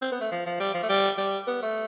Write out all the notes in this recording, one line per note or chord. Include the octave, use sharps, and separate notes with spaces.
C4
B3
A3
F3
F3
G3
F3
A3
G3
G3
B3
A3